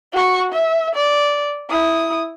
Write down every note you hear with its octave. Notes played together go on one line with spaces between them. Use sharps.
F#4 C#6
E5
D5
E4 D#6